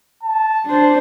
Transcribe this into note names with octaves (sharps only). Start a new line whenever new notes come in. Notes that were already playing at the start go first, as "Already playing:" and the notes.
A5
D4 C5